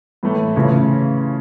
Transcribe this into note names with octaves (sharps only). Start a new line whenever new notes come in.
A2 E3 A3
C#3 E3 A3 C#4 F4